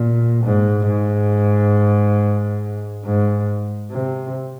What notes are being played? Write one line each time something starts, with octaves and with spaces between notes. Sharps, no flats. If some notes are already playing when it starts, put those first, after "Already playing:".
Already playing: A#2
G#2
G#2
G#2
C3